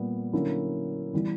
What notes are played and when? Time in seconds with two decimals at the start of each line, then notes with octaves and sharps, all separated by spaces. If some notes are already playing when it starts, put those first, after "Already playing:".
Already playing: A#2 G3 B3
0.33 D3 F#3 A#3 C#4 E4
1.13 E3 G3 B3 E4